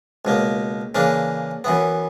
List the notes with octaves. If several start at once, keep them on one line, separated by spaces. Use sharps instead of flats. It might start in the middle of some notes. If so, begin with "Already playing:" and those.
C#2 B2 A#3
C#3 E3 A#3 D4
F#2 E3 B3